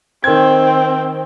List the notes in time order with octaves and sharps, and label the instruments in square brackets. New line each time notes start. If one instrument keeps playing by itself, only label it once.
[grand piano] D#3 G#6 [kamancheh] C4